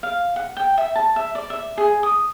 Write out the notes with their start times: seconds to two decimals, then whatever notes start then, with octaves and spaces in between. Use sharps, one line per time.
0.03 F5
0.36 F#5
0.57 G5
0.78 E5
0.96 A5
1.16 E5
1.35 D5
1.50 E5
1.78 G#4
2.03 D#6